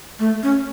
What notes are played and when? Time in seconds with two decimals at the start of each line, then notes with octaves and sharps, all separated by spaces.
0.19 A3
0.43 C#4